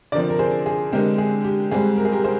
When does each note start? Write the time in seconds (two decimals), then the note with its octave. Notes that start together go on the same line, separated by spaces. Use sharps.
0.12 D3 F3 C4 A#4 D5
0.30 A#4
0.39 G#4 C5
0.66 G#4
0.93 D3 G#3 C4 G4 A#4
1.18 G#4
1.44 G4
1.71 G#2 G3 C4 G#4
1.98 A#4
2.05 G#4
2.12 G4 A#4
2.24 G#4 C5